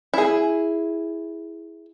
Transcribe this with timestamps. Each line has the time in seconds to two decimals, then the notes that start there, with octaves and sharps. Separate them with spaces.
0.14 E4 G#4